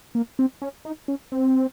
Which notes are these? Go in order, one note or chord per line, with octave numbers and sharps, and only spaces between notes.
A#3
C4
C#4
D#4
C#4
C4